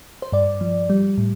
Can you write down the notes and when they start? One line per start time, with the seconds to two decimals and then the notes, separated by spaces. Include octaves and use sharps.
0.22 C5
0.32 G2 D5
0.61 F3
0.89 G3
1.18 A2